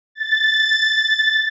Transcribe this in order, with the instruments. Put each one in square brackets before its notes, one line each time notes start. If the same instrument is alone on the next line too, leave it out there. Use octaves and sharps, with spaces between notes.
[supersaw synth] A6